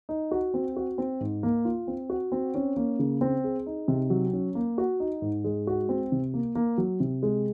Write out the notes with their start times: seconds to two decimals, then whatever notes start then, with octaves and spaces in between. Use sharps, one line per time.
0.09 D#4
0.31 F#4
0.54 C4
0.76 F#4
0.98 C4
1.21 G#2
1.43 A#3
1.65 F4
1.87 C4
2.10 F#4
2.32 C4
2.55 C#4
2.76 A#3
2.99 C#3
3.21 C4
3.44 G#4
3.66 D#4
3.88 C3
4.10 F#3
4.33 C#4
4.55 A#3
4.78 F#4
5.00 D#4
5.22 G#2
5.44 G#3
5.67 F#4
5.89 C4
6.12 C3
6.34 A#3
6.55 A#3
6.78 F#3
7.00 C3
7.23 G#3